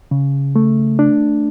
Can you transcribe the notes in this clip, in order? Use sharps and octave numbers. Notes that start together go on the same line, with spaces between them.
C#3
A3
D4